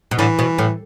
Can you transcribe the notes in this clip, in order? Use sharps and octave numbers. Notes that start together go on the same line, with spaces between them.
B2
A2 D3 E3
B2
A2